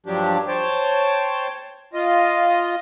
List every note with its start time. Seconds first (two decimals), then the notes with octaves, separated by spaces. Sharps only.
0.06 G2 F3 F#3 D4 G4
0.48 C5 C#5 G5 A5
1.93 F4 D#5